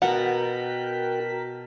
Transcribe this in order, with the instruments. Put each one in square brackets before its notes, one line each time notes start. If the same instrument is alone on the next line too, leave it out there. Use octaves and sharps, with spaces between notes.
[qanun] B2 B3 [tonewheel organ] F#4 G5 [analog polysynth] A#4 A5 B6 [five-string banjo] F#5